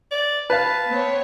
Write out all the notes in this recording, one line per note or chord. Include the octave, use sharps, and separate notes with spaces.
D5
B4 F5 A5
B3 C4 C#5